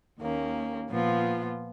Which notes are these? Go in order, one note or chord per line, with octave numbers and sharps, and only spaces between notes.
D#2 D#3 A#3 C#4
A#2 F3 B3 F4